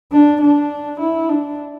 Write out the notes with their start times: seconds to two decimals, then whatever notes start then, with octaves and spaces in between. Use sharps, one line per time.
0.12 D4
0.41 D4
1.00 E4
1.29 D4